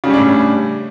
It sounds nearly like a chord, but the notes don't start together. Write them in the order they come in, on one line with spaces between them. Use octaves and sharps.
C#3 G3 C#4 D4 A2